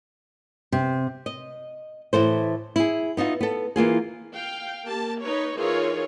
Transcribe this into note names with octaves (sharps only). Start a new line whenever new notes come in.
C3
D#5
A2 E3 A4 C5
E4 G#4
B3 D#4 F4 E5
B3 A4
E3 A#3 F4 G#4
F5 G5
A#3 G4 A5
D#4 B4 C#5
E3 D#4 F4 G#4 A#4 C#5